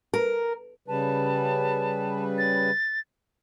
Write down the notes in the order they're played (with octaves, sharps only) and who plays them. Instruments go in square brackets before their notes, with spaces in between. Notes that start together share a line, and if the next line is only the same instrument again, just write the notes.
[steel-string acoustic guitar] A#4
[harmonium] C#3 G3 B4 [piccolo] A5
[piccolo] A6